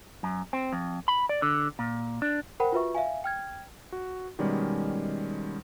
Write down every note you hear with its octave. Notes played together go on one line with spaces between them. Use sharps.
F#2
C4
F2
B5
D5
D3
A#2
D4
A#4 C5 F#5 G5 B5
F4 F#4 B4 E5 C#6
E5 F5 G#5
G5 F6 G#6
F#4
B2 D#3 G3 G#3 C#4 D5